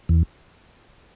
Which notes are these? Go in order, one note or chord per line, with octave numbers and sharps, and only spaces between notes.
E2